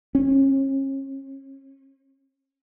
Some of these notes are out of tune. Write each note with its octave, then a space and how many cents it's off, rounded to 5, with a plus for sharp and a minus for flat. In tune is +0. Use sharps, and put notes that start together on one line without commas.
C#4 -35